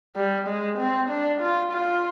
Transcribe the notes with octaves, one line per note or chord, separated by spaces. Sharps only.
G3
G#3
C4
D4
F4
F4